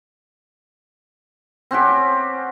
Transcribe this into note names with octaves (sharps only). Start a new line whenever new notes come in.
C4 C#4 F#4 G4